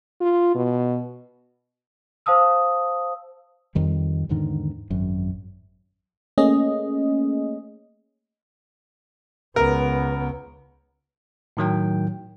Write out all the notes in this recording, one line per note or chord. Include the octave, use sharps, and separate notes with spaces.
F4
B2
C5 F5 A5 D#6 E6
F2 D#3 G3
E2 G#2 D3 D#3
G#1 F#2
A3 A#3 C#4 G#4 D#5
C#2 B3 A#4
A2 D#3 F#3 G5